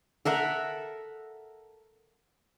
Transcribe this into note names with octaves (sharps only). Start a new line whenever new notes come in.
A4 A#4 E5 F#5